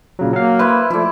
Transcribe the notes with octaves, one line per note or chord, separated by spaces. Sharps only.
A#2 C#3 F#3
F#3 A#3 F5
E4 B4 C5
F3 A3 E4 D5